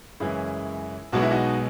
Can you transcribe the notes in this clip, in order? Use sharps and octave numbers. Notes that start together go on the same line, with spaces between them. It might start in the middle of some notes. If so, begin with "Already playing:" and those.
F#2 C#3 E3 G#3 E4 G#4
B1 B2 G#3 B3 F#4
E4
D#4 F#4